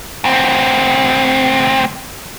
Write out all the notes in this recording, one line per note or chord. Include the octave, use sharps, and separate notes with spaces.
D2 C4